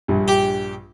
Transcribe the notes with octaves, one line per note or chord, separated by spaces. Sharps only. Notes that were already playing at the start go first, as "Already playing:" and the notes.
A#1 G2 G3
G4